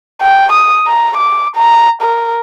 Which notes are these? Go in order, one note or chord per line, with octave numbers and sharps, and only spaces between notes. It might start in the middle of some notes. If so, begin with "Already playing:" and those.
G5
D#6
A#5
D6
A#5
A#4